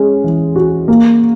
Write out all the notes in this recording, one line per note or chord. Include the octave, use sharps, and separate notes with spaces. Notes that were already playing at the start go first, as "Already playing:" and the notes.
Already playing: G#3 C#4
E3
F#4
A#3